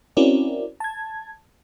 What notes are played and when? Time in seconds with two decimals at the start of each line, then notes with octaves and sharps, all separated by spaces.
0.17 C4 C#4 E4 F#4 A#4 D5
0.80 A5 G#6